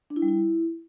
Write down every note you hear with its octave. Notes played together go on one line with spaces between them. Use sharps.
D4
E4
G3
E4